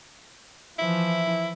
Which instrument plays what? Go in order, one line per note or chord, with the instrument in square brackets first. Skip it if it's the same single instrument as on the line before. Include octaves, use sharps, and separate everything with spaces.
[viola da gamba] E3 F3 [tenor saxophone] E4